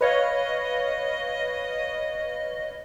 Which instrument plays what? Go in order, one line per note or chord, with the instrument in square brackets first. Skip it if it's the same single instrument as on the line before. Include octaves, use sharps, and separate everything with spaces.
[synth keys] B4 C#5 F5 [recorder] D#5